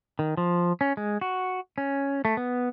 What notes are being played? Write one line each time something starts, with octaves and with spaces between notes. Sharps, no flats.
D#3
F3
C#4
G#3
F#4
C#4
A3
B3